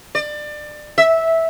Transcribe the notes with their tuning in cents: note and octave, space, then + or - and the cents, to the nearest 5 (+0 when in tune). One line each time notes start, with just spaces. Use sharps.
D5 +25
E5 -10